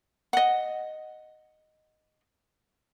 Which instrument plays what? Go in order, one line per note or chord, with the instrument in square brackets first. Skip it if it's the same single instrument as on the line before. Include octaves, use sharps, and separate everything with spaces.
[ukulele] D#5 F#5